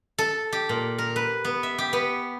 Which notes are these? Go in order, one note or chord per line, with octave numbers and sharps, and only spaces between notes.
A4
G4
A#2
A#4
B4
B3
E5
G4
B3